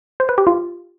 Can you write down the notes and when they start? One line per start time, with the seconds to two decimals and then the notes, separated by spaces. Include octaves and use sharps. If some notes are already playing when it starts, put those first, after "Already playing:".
0.20 C5
0.29 B4
0.38 G4
0.47 F4